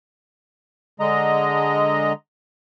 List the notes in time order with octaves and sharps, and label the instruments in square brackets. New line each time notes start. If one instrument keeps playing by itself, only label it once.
[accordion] D3 G#3 D#5 A#5